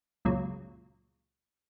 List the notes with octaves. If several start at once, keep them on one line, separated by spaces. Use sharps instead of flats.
C#2 F#2 A#2 F#3